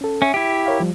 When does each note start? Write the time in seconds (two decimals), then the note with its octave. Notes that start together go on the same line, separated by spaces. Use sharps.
0.01 C#4 A4
0.22 C#4 E5
0.34 E4 G4
0.66 A#4 C#5 F5
0.80 F3 G3